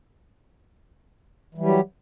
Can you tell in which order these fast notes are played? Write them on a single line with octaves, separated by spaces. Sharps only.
E3 G3 F#3 G4